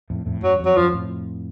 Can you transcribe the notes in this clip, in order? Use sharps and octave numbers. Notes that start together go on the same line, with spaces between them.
F2 A2
F2 A2
F#2 F#3
F2
F#3
F#2 F3
F2 A2